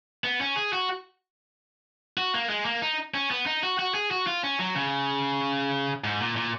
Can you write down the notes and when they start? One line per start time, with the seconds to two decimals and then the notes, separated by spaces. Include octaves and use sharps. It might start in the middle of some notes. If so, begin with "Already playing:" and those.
0.24 B3
0.41 C#4
0.56 G#4
0.73 F#4
2.18 F#4
2.34 A#3
2.49 G#3
2.65 A#3
2.82 D#4
3.14 C#4
3.31 B3
3.46 D#4
3.63 F#4
3.79 F#4
3.94 G#4
4.11 F#4
4.27 F4
4.43 C#4
4.59 F#3
4.75 C#3
6.04 G#2
6.20 A#2
6.36 A#2